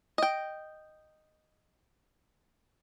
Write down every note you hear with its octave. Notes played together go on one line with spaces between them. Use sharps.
D#5 G5